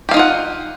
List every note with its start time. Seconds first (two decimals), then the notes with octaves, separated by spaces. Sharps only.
0.09 G4
0.11 F5
0.14 D#4
0.17 F4
0.19 F#5